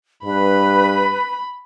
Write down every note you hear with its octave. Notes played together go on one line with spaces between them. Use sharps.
G2 B4 B5